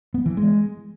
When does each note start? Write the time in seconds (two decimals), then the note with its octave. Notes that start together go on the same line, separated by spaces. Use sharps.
0.14 B3
0.26 E3
0.37 G#3